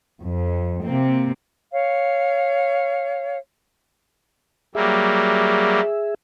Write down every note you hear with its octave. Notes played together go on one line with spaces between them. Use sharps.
F2
C3 A#3 C4
C#5 F5
F#3 G3 A#3 G#4 E5